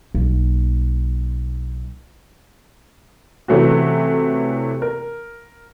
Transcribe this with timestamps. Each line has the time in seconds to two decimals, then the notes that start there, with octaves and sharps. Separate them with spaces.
0.15 B1 A#3
3.48 C3 E3 A3 C#4 F#4
4.82 A#4